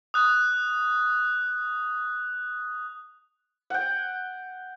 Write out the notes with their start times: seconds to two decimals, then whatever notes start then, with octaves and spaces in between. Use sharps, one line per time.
0.14 D#6 F#6
3.70 F#5 G5